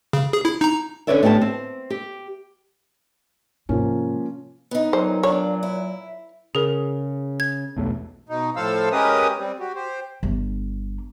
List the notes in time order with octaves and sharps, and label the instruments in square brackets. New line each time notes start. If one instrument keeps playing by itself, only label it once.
[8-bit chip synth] C#3
G#4
E4
D#4 A#5
[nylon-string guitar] D3 C#4 B4 C#5 D5 E5
A2 D3 B3 G4 A5
C4
G4
[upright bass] G#2 C3 [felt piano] F3 A#3 C#4
[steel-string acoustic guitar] B3 D#4
[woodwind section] A#2 F#3 [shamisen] C5
[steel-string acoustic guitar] D4 D5 F5 [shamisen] C#5
[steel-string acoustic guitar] E4
[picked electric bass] C#3 [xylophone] G#4 A#4
[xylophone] G#6
[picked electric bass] B1 E2 A3
[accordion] B2 D#4
A2 F3 A4 C5 F5 E6
G#3 C#4 G4 A#4 B4 D#6
G3 C4
F#4 G4
G4 C5
[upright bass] G1 D4